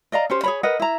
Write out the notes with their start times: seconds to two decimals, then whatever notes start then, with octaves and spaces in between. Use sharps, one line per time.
0.12 D5 D#5 F5 A#5
0.30 C#4 G4 C5
0.44 G#4 C#5 B5
0.63 A#4 B4 D#5 F#5
0.80 E4 A#5